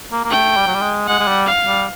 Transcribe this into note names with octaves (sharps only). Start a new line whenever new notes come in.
A#3
A#3
A3 G5
G3
F#3
G3
G#3
G#3 F#5
G#3
G3
F5
G3